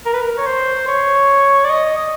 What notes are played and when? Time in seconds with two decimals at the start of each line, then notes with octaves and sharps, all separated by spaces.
0.06 A#4
0.13 B4
0.21 A#4
0.38 C#5
0.46 C5
0.88 C#5
1.65 D5
1.70 D#5
1.97 D#5